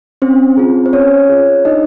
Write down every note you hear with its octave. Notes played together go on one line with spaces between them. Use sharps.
C4 C#4 C5
F4 G#4
C5
C#4 C#5
F4 G#4
D4 D#4 D#5